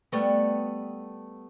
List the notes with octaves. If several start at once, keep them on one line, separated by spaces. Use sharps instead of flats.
G3 A3 B3